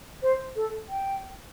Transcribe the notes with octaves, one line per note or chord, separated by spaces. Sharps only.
C5
A4
G5